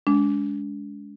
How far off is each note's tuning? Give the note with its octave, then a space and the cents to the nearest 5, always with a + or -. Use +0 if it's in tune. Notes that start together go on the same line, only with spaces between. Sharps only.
G#3 +0 D4 -40